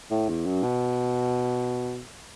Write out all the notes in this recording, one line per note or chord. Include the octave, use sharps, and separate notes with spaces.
A2
E2
F#2
B2